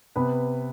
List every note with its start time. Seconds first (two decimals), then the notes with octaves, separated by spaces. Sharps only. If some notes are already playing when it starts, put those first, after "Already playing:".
0.16 C3 B3 B4